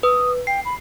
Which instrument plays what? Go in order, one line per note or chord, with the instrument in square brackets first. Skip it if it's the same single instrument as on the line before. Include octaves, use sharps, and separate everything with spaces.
[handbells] B4 [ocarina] D#6
[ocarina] G5 [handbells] C7
[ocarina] B5